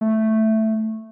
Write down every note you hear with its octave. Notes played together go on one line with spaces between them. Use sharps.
A3